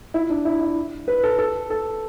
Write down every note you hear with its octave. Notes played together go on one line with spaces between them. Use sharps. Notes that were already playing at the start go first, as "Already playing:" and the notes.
E4
D4
E4
E4
B4
A4
A4
A4